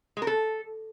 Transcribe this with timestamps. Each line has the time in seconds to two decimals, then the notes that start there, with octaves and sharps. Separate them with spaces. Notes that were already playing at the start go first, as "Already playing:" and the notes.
0.17 G#3
0.22 A#4
0.27 A4